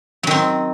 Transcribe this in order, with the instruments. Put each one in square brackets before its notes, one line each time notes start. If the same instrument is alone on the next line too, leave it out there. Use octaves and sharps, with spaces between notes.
[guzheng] F#3
D#3
C4